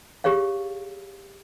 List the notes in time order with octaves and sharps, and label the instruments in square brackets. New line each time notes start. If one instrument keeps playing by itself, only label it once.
[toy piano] G4 G#4 C#5 F5